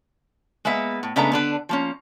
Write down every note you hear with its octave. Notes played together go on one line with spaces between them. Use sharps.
G#3 A#3 B3 E5
A2
C#3 G#3 A3 B3 D4 A#5
D3 D4 B4
F3 A#3 C#4